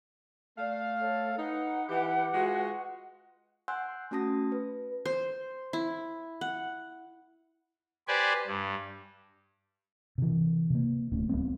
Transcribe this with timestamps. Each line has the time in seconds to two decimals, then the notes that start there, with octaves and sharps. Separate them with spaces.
0.58 A3 D5 F5
1.01 A4 C#5
1.37 D#4 B4 F#5
1.89 E3 G4
2.33 G#3 F4 F#4
3.68 F#5 G#5 C6 E6 F#6 G6
4.11 A3 C#4 F#4 A5 D#6 A#6
4.52 B4
5.06 C5
5.73 E4
6.41 F#5
8.08 G4 B4 C5 D5 G#5
8.47 G2
10.18 C3 E3
10.70 C3 A#3
11.12 D1 A3 C#4
11.29 C#2 G3 B3 C4